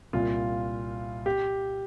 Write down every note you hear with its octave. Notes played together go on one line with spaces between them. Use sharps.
C2 A#2 F4
G4